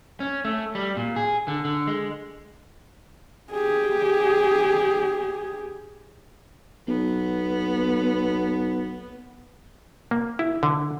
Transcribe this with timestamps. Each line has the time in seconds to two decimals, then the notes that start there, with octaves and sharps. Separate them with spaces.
0.20 C#4
0.45 A3
0.75 G3
0.97 A#2
1.16 G#4
1.48 D3
1.65 D3
1.87 G#3
3.52 G4 G#4
6.88 B1 B3
10.11 A#3
10.39 E4
10.63 D3